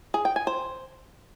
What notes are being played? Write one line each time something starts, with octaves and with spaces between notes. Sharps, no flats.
G#4
G5
G#5
C5